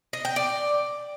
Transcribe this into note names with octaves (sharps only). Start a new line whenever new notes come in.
D#5
G5
D5